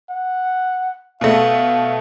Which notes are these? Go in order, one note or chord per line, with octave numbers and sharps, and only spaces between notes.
F#5
B2 A3 F5